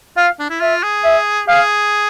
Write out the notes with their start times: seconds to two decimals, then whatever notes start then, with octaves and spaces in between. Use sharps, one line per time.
0.17 F4 F5
0.39 D4
0.50 E4
0.60 F4 E5
0.83 G#4
1.04 E5
1.48 G#4 F5